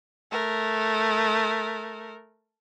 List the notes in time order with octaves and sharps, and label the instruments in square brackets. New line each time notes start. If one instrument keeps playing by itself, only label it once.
[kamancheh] A3 A#4